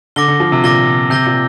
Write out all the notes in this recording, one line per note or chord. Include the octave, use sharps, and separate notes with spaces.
D3 D6 A#6 G7
D3
F3
C3
A#2 D6 A#6 G7
C3 G6 A#6 G7
A#2